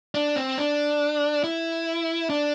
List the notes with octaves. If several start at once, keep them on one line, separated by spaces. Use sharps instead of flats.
D4
C4
D4
E4
D4